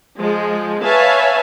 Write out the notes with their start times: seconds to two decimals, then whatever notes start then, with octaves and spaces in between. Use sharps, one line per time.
0.19 F3 G#3
0.84 B4 C#5 E5 F5 G#5 A5